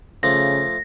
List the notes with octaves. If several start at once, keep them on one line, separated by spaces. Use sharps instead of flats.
C#3 F3 A3 A#6